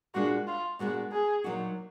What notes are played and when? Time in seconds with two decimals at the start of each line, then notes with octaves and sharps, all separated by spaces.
0.14 A#2 G#3 D4 F4 F#4
0.47 F4
0.79 A#2 G#3 B3 D4 F#4
1.12 G#4
1.44 A#2 F#3 A#3 D#4 F#4